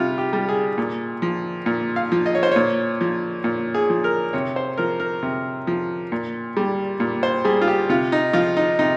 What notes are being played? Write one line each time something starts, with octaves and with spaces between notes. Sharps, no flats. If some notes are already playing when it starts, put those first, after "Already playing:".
Already playing: C3 G3 F4
G4
G3
G#4
A#2
F3
A#2
F5
F3
D#5
C#5
C5
A#2 C#5
F3
A#2
G#4
F3
A#4
C3 C#5
C5
F3 A#4
A#4
C3
F3
A#2
G3
A#2
C5
G3 G#4
F4
G4
C3 F4
D#4
F3 F4
D#4
C3 D#4